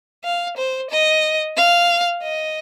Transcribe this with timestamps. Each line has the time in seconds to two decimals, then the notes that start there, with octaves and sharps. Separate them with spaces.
0.24 F5
0.57 C5
0.90 D#5
1.57 F5
2.23 D#5